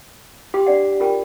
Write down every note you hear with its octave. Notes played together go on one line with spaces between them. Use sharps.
G4 G5 C6
D4 D5 F#5
F4 A#4 G5